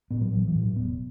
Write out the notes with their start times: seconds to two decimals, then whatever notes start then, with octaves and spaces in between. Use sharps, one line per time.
0.11 A2 B3
0.21 F#3
0.33 A1 F#3
0.48 E3
0.55 A2
0.62 F#3
0.76 E1 B3